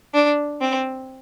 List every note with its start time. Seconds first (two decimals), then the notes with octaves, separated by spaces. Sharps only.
0.14 D4
0.61 C4